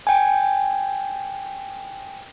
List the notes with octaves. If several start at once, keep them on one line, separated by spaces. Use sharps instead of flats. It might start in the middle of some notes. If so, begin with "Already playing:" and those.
G5 G#5